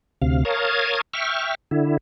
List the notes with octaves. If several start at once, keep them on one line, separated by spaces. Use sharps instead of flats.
D2 C3 F5
A#4 C#5 F5 A5 D#6 G#6
E5 G5 C#6 F6
D3 E4